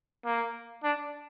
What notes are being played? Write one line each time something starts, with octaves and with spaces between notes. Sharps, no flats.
A#3
D4